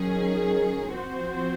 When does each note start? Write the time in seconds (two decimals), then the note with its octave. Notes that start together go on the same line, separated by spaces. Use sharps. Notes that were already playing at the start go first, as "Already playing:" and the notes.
Already playing: D#3 F#3 C#4 G#4
0.93 F3 C4 F#4 C5